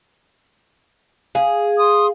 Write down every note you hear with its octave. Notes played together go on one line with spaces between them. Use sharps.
G#4 F5
C6 D#6